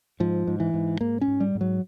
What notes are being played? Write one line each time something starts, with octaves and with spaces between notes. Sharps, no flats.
G#2 F3
G#2
E3
G#2
G#2 A#3
C#4
G#2
G3
G#2
F#3